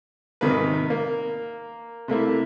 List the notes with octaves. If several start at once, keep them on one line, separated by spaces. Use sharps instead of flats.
G#1 C3 D#3 A#3 B4
A#3
C3 A3 A#3 E4